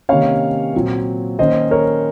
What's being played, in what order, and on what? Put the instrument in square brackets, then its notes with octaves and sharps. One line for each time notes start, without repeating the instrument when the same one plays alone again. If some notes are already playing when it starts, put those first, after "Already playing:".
[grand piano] C3 D#3 A#3 C#4 C#5 F5
A#2 F#3 C4
D#3 A#3 C#4 C5 D#5
A#4 C#5